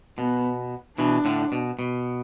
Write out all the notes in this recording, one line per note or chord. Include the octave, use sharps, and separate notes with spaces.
B2 B3
B2 E3 D4
A2 D3
B2
B2